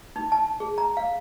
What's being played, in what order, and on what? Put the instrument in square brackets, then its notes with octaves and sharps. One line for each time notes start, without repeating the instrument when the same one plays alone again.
[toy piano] D#4
A5
G#4
A#5
F5